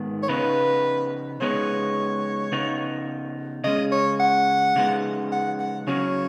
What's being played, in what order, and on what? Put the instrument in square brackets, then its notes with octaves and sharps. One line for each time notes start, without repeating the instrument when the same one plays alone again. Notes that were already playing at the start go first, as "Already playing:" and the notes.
Already playing: [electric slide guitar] G#2 D#3 B3
[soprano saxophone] C#5
[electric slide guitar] C#3 B3 D#4 [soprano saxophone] B4
[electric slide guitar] C#3 G#3 B3 D#4 [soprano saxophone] C#5
[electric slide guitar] C#3 B3 D#4
[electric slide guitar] C#3 G#3 C#4 [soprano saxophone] D#5
[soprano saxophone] C#5
F#5
[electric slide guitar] C#3 G#3 B3 D#4
[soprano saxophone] F#5
F#5
[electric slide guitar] C#3 F#3 C#4 [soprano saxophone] C#5